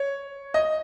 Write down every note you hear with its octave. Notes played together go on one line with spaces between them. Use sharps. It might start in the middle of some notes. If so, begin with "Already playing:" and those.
Already playing: C#5
D#5